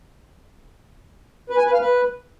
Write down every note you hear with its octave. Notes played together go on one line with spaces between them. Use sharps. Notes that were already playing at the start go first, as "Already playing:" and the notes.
B4
G#5
B4
F5
B4